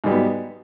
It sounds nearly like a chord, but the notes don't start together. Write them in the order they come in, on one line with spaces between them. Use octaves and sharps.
G#2 G3 F#3 B3